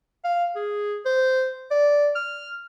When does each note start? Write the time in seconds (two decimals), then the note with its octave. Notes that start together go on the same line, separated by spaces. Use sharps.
0.24 F5
0.56 G#4
1.06 C5
1.71 D5
2.16 F6